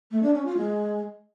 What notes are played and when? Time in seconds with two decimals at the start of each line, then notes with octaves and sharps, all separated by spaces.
0.11 A3
0.22 D4
0.34 C#4
0.45 F4
0.57 G#3